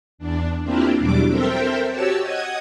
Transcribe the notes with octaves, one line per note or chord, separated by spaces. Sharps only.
E2 D4
A#3 C4 D4 E4 F4 G4
E2 B2 F#3 G3 D4 D6
C4 A4 A#4 C5 E5 G5
F#4 G4 C#5 A5 E6
D#5 F#5 D#6 G#6